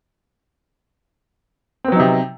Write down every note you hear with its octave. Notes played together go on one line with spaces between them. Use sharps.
C3 F#3 B3 C4 D#4